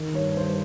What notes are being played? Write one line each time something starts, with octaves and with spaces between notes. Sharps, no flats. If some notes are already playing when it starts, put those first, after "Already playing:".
Already playing: D#3
G2 C#5
G2 C5